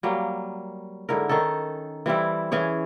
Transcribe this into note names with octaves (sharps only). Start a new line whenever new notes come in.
F#3 G3 A#3
G#2 D3 E4 A#4
D#3 C#4 D#4 A4
E3 G3 C4 E4
E3 C#4 G#4 C#5